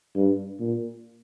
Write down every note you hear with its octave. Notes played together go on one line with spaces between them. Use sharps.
G2
A#2